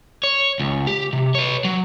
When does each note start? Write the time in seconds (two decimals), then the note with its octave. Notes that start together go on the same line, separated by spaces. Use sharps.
0.23 C#5
0.60 C#2
0.87 G4
1.13 C3
1.35 B4 C#5
1.65 F#3